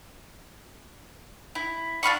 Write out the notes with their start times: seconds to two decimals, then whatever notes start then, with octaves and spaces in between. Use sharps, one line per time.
1.55 E4
2.03 D4 F4 B5 C#6